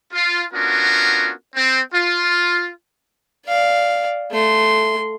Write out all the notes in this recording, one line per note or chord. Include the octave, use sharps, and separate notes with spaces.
F4
B3 C#4 D4 F4 F#4 A#4
C4
F4
D5 F5
A3 C6